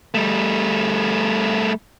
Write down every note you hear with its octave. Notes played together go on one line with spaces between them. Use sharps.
G3 A3